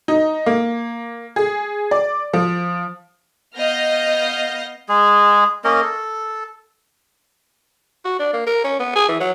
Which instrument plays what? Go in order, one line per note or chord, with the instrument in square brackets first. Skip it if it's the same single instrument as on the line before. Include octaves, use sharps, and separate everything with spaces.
[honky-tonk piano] D#4
A#3
G#4
D5
F3
[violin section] B3 D#5 F5 F6 G6 A#6
[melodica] G#3 G#4
A#3 C#4 A#4 D#5
A4
[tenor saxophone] F#4
D4
A#3
A#4
C#4
B3
G#4
E3
F#3